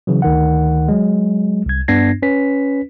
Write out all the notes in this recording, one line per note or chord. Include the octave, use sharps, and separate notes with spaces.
C#3 E3 F#3
D2 D#3 F#5
F#3 G#3
C2 G#6
G2 B3 D4 G#6 A#6 C7
C#4 B4 B6